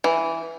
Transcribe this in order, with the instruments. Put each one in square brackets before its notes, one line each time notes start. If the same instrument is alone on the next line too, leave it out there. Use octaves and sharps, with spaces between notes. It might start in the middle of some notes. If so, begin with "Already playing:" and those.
[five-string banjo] E3